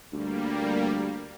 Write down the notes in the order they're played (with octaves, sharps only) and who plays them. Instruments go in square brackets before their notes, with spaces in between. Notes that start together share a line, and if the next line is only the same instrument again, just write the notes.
[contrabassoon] D2 [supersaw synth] G3 A#3